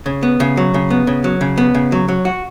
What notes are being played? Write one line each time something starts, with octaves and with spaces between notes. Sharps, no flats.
C#3
B3
C#3
F#3
C#3
B3
C#3
F#3
C#3
B3
C#3
F#3
F#3
F#4